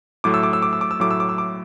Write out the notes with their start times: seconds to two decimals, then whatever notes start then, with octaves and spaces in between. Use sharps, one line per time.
0.24 A2 F#3 A3 D6
0.34 E6
0.43 D6
0.53 E6
0.62 D6
0.73 E6
0.81 D6
0.91 E6
1.00 A2 F#3 A3 D6
1.11 E6
1.20 D6
1.29 E6
1.38 D6